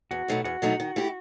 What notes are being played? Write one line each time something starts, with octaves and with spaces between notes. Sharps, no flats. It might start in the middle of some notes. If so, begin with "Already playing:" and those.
E2 F#4
B2 F#3 A3 D#4
E2 F#4
B2 F#3 A3 D#4
D#3
A3 E4 G4